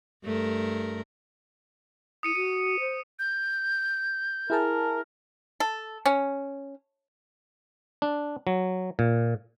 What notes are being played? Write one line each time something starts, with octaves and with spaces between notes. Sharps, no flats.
G2 A3 A#4
E4 D#6 C#7 D#7
F#4 D#7
C5
G6
E4 G#4 A#4 A5
A4
C#4
D4
F#3
A#2